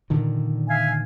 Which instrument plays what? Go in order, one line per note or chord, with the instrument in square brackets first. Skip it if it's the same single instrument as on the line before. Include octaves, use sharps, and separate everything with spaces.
[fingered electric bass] A#2 D3 D#3
[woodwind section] E5 F5 G#5